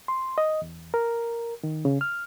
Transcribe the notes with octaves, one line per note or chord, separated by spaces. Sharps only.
C6
D#5
E2
A#4
D#3
C#3
F6